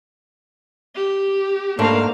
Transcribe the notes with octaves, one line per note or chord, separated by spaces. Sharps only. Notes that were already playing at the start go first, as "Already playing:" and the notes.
G4
G#2 A3 A#3 D4 F5